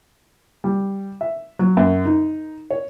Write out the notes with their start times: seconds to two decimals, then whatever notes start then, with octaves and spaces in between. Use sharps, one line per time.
0.64 G3
1.21 E5
1.59 F#3
1.77 F#2
2.05 D#4
2.70 C#5